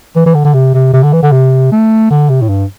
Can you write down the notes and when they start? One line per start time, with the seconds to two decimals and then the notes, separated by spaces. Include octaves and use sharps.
0.16 E3
0.26 E3
0.35 D3
0.45 D3
0.54 C3
0.75 C3
0.93 C3
1.03 D3
1.13 E3
1.23 D3
1.32 C3
1.72 A3
2.11 D3
2.29 C3
2.42 A2
2.49 G2